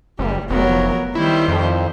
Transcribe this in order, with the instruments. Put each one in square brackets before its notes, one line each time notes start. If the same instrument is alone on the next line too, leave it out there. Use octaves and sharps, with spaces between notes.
[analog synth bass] F#1 [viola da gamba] G3
[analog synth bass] F1 [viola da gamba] F#3 B3 A#4
[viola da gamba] D#3 G3 C5 [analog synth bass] E4
[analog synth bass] F2